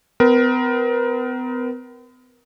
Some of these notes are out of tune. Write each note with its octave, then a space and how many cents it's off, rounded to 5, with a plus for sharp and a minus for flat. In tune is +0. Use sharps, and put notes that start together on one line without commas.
B3 +45 A#4 +20